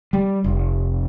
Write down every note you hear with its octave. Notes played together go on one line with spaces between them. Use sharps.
G3
F1